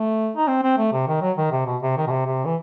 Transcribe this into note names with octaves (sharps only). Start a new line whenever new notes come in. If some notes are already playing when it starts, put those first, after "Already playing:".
Already playing: A3
D#4
C4
C4
A3
C3
D#3
F#3
D#3
C3
B2
C3
D#3
B2
C3
C3
E3